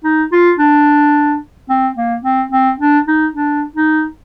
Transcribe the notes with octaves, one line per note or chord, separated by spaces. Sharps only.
D#4
F4
D4
C4
A#3
C4
C4
D4
D#4
D4
D#4